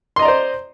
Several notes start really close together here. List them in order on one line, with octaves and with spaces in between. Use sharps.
C6 D#5 A#5 D5 C5